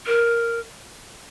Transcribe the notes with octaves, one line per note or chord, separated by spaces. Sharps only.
A#4